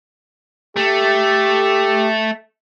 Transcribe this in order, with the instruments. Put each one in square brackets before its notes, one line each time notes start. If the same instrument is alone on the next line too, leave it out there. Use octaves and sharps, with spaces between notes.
[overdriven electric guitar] A3 [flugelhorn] G4